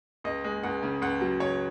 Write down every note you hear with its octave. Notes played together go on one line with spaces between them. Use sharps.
C#2 D#5
G#3
C#2 F#5
C#3
C#2 F#5
F#3
C#2 C#5